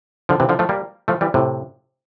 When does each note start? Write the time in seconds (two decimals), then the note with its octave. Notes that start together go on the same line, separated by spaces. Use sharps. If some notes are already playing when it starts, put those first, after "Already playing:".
0.29 D3 F3
0.40 C3 E3
0.49 D3 F3
0.59 F3 A3
0.69 G3 A#3
1.08 F3 A3
1.21 E3 G3
1.34 A2 C3